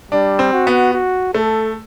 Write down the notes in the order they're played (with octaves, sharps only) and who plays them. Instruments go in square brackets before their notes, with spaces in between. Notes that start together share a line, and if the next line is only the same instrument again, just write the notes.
[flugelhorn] G3 [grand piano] D4
[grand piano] C4
[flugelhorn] F#4
[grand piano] B3
[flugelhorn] F#4
[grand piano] A3 [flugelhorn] A4